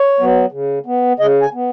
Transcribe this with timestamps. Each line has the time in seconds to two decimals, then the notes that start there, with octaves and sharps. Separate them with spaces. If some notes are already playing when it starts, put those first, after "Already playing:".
Already playing: C#5
0.19 F#3 B3
0.52 C#3
0.86 B3
1.19 C#3 D#5
1.42 G#5
1.54 B3